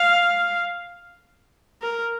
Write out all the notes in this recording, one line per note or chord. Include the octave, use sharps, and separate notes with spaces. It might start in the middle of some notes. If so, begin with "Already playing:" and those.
Already playing: F5
A#4